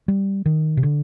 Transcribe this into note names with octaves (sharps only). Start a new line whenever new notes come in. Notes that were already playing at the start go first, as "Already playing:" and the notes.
G3
D#3
C3
D3